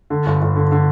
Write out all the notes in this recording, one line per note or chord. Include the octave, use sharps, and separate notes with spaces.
D3
G1
G1
D3
D3